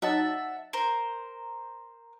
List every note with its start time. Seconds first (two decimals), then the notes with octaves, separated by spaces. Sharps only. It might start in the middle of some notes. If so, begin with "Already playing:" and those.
0.02 F#3 D#4 E5 F#5 A5
0.73 A#4 C5